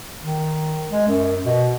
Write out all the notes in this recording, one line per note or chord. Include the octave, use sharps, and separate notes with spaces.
D#3
G#3
F#2
B2